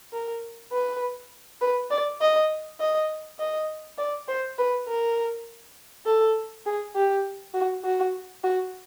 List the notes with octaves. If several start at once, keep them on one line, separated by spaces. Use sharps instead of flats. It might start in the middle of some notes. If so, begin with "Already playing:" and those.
A#4
B4
B4
D5
D#5
D#5
D#5
D5
C5
B4
A#4
A4
G#4
G4
F#4
F#4
F#4